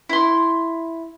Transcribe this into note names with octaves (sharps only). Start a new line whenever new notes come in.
E4 C6